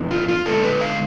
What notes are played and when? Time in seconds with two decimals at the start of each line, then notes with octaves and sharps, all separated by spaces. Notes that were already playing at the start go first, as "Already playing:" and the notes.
Already playing: F2 E3 B3 D4
0.11 F4
0.28 F4
0.46 D3 G#3 B3 D4 A4
0.63 B4
0.81 F5